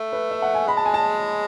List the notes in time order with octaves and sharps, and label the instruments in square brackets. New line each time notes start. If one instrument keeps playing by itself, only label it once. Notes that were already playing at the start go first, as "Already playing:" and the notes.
Already playing: [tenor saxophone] A3
[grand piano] B4
E5
F#5
G#5
[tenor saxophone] G#3 [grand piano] B5
[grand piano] A5
G#5
A5